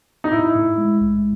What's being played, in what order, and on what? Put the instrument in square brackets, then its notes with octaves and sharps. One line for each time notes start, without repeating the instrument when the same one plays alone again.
[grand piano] D#4
[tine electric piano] A2 [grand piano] E4
[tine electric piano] A2
G#3
B1